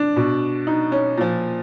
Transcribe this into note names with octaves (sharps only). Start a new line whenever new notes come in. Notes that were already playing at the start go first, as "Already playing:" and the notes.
Already playing: D4
B2
D#4
C#4
A#2 F3